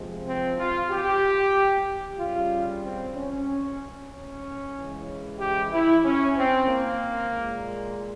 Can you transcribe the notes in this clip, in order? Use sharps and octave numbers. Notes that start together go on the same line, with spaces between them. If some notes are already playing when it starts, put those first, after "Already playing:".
Already playing: C3 F3 G#3
C4
F4
G4
C#3 G3 F4
C4
C#4
C#4
C#3 E3 G#3
G4
E4
C#4
C4
A#3
A#2 G#3